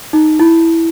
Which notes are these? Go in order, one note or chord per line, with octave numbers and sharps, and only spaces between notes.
D#4
E4